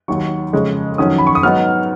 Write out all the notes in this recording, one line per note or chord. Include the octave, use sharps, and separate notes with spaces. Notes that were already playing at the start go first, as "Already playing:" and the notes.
D#2 D#3 F#3 C#6
F2 C#3 G#3 C#4
F2 D#3 F#3 C#4 D#6
B5
C#6
D#6
G#2 F#3 B3 D#4 F6